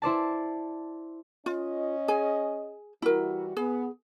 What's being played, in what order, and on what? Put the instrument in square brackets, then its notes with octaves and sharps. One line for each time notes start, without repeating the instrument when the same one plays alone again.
[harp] E4 C5 D5 A5
[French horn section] C#4 D#5 [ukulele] F4
[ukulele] G#4 G#5
[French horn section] E3 G3 F#4 [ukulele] E4 A#4
[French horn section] B3 [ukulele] G#4